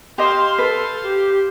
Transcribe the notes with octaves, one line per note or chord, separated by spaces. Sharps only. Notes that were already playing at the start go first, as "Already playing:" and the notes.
G4 C5 D#5 F5 C6
A4 B4
G4